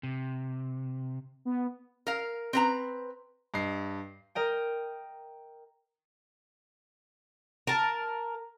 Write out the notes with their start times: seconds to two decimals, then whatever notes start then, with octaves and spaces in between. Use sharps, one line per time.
0.03 C3
1.45 B3
2.07 A#4 F5
2.53 C4 B4 A#5
3.54 G2 D#5 C7
4.35 A#4 D#5 G5
7.67 A#4 A5